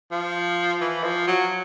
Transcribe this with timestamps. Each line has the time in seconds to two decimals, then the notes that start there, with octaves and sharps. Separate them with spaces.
0.11 F3
0.81 E3
1.04 F3
1.27 F#3